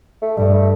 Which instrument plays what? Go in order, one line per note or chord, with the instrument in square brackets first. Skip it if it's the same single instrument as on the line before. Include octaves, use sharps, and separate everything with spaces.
[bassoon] A3
[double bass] G2 [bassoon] G3
[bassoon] A3